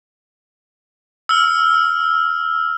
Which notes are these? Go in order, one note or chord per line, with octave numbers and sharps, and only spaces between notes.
E6 F6